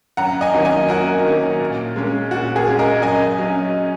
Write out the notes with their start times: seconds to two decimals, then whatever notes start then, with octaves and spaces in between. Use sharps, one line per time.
0.17 F#2 F#5 A#5
0.41 D#5 G#5
0.53 D#3 F#3 A#3 C#4
0.65 D#5 G#5
0.88 F#2 F#4 A#4
1.24 D#3 F#3 A#3 C#4
1.60 A#2
1.96 G#3 C#4
2.31 A#2 F#4
2.56 G#4
2.67 G#3 C#4
2.79 A#4 D#5
3.02 F#2 D#5 G#5
3.38 F#3 C#4